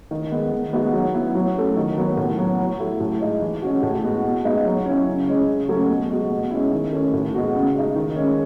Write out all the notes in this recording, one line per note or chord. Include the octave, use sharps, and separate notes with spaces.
D#3
G#3 B3
D#3
G#3 B3 D#4 F#4
F#3
B3 E4
F#3
A3 C#4
D#3
F#3 B3
A2
F#3 B3
F#3
A3 E4
A2
G#3 D#4
E3
G#3 C#4 F#4
A2
G#3 B3 F#4
B2
G#3 B3 D#4
F#3
C#4 E4
C#3
G#3 C#4
C#3
F#3 A3 C#4
B2
G#3 B3 F#4
B2
G#3 C#4 E4
D#3
A3 C#4
A2
G#3 B3 F#4
C#3
G#3 D#4
D#3
G#3 C#4